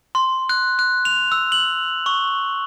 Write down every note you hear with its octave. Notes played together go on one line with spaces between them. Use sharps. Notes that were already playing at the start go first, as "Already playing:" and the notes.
C6
F#6
F#6
F7
E6
F#7
C#6